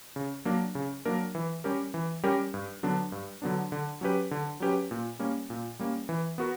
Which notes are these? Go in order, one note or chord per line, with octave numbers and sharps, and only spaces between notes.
C#3
F#3 A#3 D4 A#4
C#3
F#3 A#3 D4 A#4
E3
G3 C#4 G4 A#4
E3
G3 C#4 G4 A#4
G2
D3 F#3 B3 D4
G2
D3 F#3 B3 D4
D3
F#3 C#4 G4 B4
D3
F#3 C#4 G4 B4
A#2
G3 A#3 C#4
A#2
G3 A#3 C#4
E3
B3 F#4 A#4